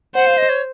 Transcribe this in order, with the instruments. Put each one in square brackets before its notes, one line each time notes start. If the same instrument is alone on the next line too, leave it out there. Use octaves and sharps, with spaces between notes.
[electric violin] C5 [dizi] F#5
[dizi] F5
D#5
C#5